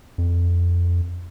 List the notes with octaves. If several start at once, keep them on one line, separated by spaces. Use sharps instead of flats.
F2